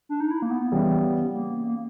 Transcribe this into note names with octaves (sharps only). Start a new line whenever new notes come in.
D4
D#4
E4
A#3
B3
C#3 E3 G3
A#3
A#3